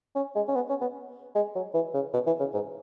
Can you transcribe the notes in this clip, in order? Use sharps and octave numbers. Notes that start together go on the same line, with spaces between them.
C#4
G#3
C#4
B3
C#4
B3
G#3
F#3
E3
C#3
B2
E3
C#3
G#2